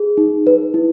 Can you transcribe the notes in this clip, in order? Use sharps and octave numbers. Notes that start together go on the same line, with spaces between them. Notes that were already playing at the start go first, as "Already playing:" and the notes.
Already playing: G#4
D#4
B4
E4